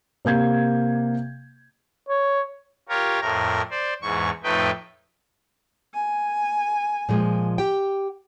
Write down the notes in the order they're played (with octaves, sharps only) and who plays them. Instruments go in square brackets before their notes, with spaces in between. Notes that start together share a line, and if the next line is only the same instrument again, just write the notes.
[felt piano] C3 A#3 G6 G#6
[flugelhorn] C#5
[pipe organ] F4 G4 A#4 C#5
F2 A2 A#4 A#5
C5 D5
E2 G#2 C#6
F2 A2 A3 D#4 B4 G5
[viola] G#5
[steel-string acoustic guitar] A#2 F3 G#3
G4 G5